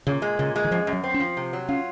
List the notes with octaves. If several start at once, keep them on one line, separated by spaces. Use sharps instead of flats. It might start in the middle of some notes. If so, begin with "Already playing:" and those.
A#2 C#3
G#3
A#2 C#3
G#3
D#3
F#2 F3
F#2
F#3
C4
C#4
F3
C3
F#3
C#4 F4